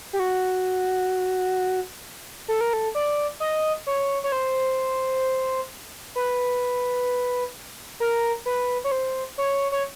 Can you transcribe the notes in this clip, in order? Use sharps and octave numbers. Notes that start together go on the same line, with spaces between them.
G4
F#4
A4
A#4
A4
D5
D#5
C#5
C#5
C5
B4
A#4
B4
C#5
C5
C#5
C#5